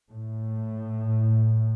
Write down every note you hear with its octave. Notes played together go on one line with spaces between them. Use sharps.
A2